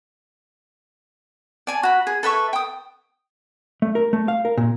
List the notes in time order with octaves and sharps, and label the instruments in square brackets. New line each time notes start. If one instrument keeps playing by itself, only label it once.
[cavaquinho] D5 G#5 A5
F#4 B5
G#4
A4 B4 E5 C#6
G5 D#6
[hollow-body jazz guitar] A3
A#4
A3
F5
A#4
A#2